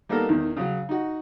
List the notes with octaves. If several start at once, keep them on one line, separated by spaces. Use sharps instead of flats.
G3 A#3 B3 D#4 A4 A#4
E2 D#3
C#3 F#3
D#4 F#4